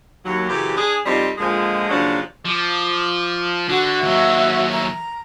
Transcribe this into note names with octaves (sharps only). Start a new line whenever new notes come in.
D#2 F#3
F#2 C#3 E3 G4
D4 G#4
F2 F3 G3 C4 D#4
A#2 D3 F3 G#3
D#2 C#3 F3 F#3 D4
F3 D6
D3 F#4
D#2 F#3 E5
A#5